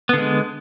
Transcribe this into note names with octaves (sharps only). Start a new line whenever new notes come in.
D3 G#3 B3